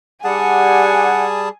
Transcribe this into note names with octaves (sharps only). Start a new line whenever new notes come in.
G3 D4 G4 G#4 F#5 G#5 A5